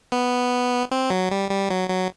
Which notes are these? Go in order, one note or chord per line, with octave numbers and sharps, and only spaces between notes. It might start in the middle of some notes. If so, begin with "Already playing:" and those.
B3
C4
F#3
G3
G3
F#3
F#3